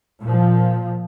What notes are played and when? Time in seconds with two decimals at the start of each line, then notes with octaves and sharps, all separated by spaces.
0.21 A#2 F3